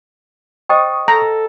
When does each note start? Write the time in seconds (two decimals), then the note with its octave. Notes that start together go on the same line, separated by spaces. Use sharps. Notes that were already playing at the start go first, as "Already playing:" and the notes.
0.69 C5 D#5 G5 C#6 D#6
1.08 A4 A#5